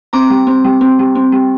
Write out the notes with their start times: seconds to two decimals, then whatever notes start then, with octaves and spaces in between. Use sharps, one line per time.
0.13 C4 A#5 D6
0.30 G3
0.47 C4
0.64 G3
0.81 C4
0.99 G3
1.15 C4
1.32 G3